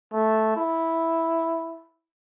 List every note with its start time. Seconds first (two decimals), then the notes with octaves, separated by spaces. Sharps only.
0.13 A3
0.56 E4